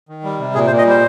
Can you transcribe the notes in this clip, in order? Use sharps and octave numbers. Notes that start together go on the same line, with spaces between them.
D#3
G3
C3
A#2 G#4
C5
A#2
D#5
G3 C5